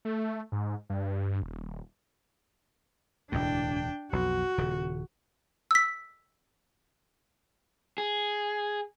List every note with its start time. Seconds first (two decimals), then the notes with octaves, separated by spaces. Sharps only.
0.05 A3
0.52 G#2
0.89 G2
1.43 D#1
3.32 E1 D2 A2 D4 G5
4.13 B1 F2 F#4
4.58 D#1 C#3
5.71 E6 B6
7.98 G#4